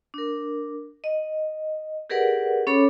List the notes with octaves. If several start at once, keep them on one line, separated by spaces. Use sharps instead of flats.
D4 A#4
D#5
G4 G#4 A#4 B4 D5 F#5
C#4 A4 C#5 B5 D6